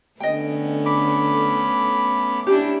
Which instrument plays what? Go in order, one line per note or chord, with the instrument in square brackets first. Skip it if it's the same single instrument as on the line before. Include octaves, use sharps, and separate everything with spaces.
[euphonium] D3 [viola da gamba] A3 B3 C#4 [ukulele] D#5 G5
[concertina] B5 D6
[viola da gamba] C#4 D4 E4 [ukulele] G4